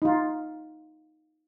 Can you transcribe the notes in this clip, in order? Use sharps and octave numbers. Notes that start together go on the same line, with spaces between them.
D#4 F4